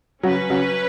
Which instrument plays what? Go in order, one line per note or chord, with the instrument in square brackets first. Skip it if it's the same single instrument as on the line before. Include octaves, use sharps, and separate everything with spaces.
[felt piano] C#3 F#3 [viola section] C#4 B4
[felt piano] C#3 F#3